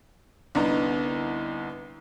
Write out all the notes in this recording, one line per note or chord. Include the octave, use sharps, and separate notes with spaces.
C2 D3 B3 D#4 A#5